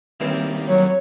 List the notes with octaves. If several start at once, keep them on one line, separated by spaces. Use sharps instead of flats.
D#3 E3 G3 A#3 C4 C#4
F#3 C#5